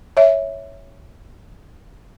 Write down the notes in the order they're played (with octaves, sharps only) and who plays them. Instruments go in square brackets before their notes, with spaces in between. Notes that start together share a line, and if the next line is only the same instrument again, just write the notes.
[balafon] C#5 E5